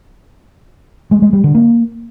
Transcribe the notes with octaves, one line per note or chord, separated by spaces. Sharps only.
G#3
G#3
G3
D3
A#3